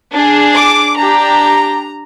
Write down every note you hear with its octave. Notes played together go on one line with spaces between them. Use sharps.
D4 G#4
D6
D4 G4 A#5